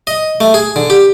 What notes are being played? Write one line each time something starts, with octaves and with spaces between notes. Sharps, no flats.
D#5
A3
G#4
D3
G4